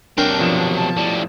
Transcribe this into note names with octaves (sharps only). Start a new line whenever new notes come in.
C3 F#3 D4 A#4 G5 C6
B2 F3 E7
A5
A2 G3